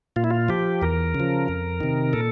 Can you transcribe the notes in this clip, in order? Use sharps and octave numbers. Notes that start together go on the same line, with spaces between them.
A#2 F4
E4
F4
F3 G4
E2 A#4
C#3
F3
F2
C3 D#3
A#2 A4